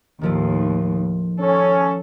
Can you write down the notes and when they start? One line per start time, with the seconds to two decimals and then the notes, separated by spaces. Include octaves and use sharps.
0.21 D#2 A2 D#3 F3 A3
1.40 C#4 A4